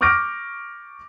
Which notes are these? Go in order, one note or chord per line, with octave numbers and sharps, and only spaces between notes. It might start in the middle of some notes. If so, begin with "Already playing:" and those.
C#6 D6 F6 G6 A#6 D7